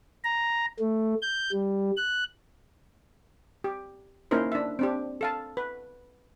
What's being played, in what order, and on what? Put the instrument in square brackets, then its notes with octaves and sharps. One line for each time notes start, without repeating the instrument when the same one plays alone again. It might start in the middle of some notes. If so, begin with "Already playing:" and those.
[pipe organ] A#5
A3
G6
G3
F#6
[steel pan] G4
A#3 C#4 D#4 E4 A#4 C5
D4 E5
C4 D4 G4
A4 F5 A5
B4